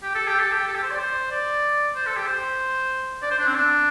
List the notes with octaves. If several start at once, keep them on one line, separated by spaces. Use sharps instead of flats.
G4
A4
G4
A4
G4
A4
G4
C5
D5
C5
D5
C5
A4
G4
C5
D5
C5
D4
C4
D4